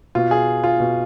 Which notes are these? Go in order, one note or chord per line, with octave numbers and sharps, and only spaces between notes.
B2 F4
G#4
F4
B2